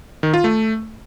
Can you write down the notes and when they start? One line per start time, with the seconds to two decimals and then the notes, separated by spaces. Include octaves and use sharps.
0.23 D#3
0.34 F4
0.44 A3